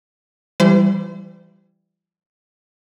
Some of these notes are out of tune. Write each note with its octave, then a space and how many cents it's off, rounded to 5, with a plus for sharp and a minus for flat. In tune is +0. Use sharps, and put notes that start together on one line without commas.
E3 +30 G3 +0 C5 -30